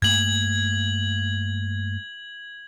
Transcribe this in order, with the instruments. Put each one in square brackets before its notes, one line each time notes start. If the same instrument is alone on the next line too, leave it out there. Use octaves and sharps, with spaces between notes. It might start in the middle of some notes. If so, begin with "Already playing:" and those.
[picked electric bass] G2 A3 A#3 [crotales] G#6 F#7